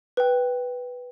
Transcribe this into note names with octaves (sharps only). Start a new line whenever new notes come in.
B4 G5